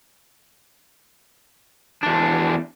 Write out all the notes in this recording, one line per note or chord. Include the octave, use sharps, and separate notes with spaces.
E2 D4